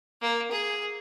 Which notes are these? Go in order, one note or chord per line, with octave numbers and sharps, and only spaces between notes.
A#3
G#4